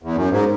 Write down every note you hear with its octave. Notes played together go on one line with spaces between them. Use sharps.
E2
F#2
G#2